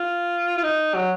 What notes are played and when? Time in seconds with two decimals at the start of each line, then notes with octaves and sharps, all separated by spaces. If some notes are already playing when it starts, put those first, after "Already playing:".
Already playing: F4
0.58 F4
0.64 D#4
0.95 F#3